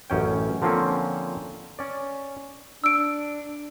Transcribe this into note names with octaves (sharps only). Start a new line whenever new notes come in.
A1 F#2 C#4 G5
D3 F3 A#3 C4 C#4
C#4 D5
D4 E6 D7